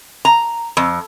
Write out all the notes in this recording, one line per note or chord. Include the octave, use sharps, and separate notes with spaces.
A#5
F2